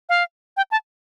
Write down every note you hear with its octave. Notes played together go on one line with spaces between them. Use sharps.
F5
G5
A5